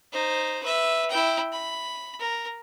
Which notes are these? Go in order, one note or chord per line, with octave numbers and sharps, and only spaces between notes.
D#4 C5
B4 E5
E4 G5
B5
A#4